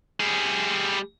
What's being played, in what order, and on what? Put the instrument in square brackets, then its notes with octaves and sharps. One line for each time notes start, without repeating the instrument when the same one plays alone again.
[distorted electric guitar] G3 G#4